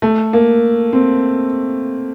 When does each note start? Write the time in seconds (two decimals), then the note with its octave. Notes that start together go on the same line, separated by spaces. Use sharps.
0.02 A3
0.33 A#3
0.93 C4